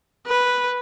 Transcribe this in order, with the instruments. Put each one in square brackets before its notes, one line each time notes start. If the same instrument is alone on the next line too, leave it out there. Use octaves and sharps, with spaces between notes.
[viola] B4